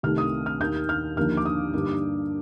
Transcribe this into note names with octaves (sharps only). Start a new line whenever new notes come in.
C2 C3 D#3 A3 D#4 F6
D#6
F6
D#2 D#3 A#3 D#4 G6
F6
D#2 D3 F3 A#3 D#4 F6
D6
D#6
G2 D3 G3 A#3 D#4